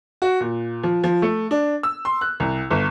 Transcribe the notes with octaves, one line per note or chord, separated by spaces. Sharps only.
F#4
A#2
F3
F3
A3
D4
E6
C6
F#6
C2
G1